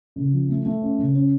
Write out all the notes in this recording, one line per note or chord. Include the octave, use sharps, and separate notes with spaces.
C#3
F3
A3
A3
C#4
C#3
C#4